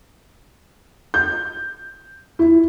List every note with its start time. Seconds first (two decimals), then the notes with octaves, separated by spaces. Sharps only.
1.14 G6
2.39 E4